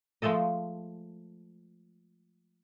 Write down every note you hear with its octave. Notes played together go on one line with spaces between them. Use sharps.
F3 G#3 A3 A4 D#5